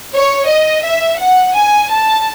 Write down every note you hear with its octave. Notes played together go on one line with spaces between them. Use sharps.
C#5
D#5
E5
F#5
G#5
A5